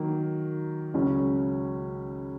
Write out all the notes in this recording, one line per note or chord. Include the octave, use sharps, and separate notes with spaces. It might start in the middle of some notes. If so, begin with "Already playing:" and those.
Already playing: D#3 F#3 A#3
C#2 C#3 F#3 C#4